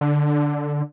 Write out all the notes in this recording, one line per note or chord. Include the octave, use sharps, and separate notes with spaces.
D3